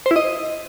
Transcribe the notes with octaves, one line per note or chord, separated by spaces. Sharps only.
C5
E4
D#5